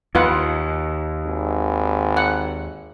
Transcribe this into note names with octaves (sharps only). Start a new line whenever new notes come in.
D#2 F4 B4 F#5
G#1
F#5